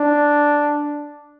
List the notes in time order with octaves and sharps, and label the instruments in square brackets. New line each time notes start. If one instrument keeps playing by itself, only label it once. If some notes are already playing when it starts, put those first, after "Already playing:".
Already playing: [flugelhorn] D4